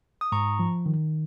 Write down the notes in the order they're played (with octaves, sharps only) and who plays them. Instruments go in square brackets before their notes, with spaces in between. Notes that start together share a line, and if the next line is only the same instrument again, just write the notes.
[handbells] D#6
[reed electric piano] G#2 [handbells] A#5 C#6
[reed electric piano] F3
D#3